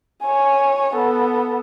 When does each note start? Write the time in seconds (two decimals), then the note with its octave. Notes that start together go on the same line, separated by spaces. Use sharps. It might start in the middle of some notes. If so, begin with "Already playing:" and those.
0.22 C#5 G#5
0.95 B3 A4